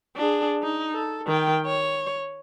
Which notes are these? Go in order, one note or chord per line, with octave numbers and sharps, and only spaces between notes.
D4 G#4
D#4
A4
D#3 G5
C#5